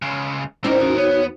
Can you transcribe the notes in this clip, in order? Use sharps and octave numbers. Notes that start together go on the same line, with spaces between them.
C#2 C#3
A2 C4 C#4 D#4 E4 A#4 D5
E2 C#4 D#4 F#4
B3 C#5